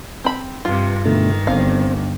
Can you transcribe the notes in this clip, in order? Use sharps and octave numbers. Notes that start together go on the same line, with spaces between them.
C4 B5
G2 C3 F4
G2 B2 D3 D#3 A3
G1 C4 F5